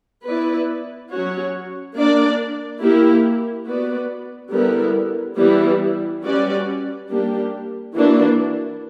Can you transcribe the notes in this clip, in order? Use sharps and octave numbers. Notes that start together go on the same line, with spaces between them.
B3 E4 B4 D5
F#3 C#4 F#4 C#5
A#3 D4 A#4 D5
A#3 E4 G4 A#4
B3 F#4 B4 D5
D3 G3 B3 E4 A#4
E3 G3 B3 E4
G3 C#4 F#4 B4 D5
G3 A#3 D4 G4
E3 A#3 D4 F#4